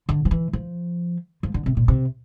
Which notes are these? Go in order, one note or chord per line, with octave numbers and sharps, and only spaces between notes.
D3
F3
E3
F3
F3
D3
C3
A#2
C3